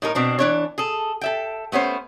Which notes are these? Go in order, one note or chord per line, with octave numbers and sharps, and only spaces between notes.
A2 D#4 A#4
B2 C4 D4
E3 D4 C#5
G#4 A4
A4 E5 G5
A3 B3 C#4 C5